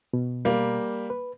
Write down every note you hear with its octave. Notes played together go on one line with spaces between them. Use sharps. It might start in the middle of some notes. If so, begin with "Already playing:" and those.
B2
G3 A#3
B4